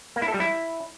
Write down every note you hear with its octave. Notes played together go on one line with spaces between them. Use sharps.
A#3
E4
A4
G3
E4